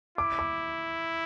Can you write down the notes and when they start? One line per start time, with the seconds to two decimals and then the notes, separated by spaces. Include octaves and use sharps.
0.18 E4 D6
0.39 D6